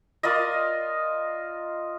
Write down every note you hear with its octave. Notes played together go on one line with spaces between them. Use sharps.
F4 A#4 D5 D#5